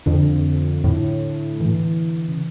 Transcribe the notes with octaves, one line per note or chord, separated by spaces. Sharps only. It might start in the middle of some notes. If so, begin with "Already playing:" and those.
F2 D3
A2
E3
C#3